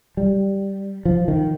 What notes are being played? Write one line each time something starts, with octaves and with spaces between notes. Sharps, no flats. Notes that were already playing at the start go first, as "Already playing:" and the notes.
G3
F3
D#3